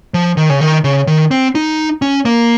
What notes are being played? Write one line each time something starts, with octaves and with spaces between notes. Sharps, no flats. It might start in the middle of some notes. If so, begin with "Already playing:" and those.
F3
D#3
C#3
D#3
C#3
D#3
C4
D#4
C#4
A#3